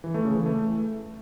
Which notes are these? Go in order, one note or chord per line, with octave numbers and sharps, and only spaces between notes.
E3
A3
C#3
E3
A3